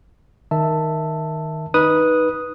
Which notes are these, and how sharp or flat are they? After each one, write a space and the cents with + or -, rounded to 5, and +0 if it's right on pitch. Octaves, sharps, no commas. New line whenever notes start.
D#3 +0 E5 +0 A5 +10
D#4 +0 B4 -10 D#6 +0